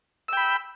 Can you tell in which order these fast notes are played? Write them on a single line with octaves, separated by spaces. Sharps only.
E6 G5 B5